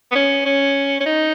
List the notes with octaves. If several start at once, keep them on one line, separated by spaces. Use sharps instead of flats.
B3
C#4
C#4
C#4
D#4